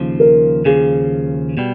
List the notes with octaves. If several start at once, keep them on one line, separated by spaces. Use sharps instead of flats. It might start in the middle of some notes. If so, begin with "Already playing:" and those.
Already playing: D#2 C#3 F3
A#4
D#2 C#3 F3 G#4
B2 G3